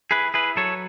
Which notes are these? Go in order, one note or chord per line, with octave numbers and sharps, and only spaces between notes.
E4 G#4 B4
E4 G#4 B4
F#3 A4 C#5